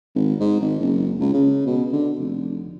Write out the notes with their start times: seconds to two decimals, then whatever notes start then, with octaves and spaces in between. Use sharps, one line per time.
0.15 G#1
0.40 G#2
0.60 G#1
0.80 F#1
1.20 C#2
1.33 C#3
1.66 B2
1.92 D3
2.19 F1